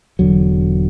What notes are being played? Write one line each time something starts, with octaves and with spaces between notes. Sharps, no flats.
E1 E2 D3 F#3